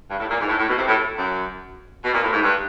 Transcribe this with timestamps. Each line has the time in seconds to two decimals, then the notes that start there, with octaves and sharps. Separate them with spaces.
0.10 G2
0.19 A2
0.30 A#2
0.39 G#2
0.48 A2
0.59 A2
0.68 B2
0.78 C3
0.88 A2
1.17 F#2
2.04 B2
2.13 A#2
2.23 A2
2.33 G#2
2.42 G2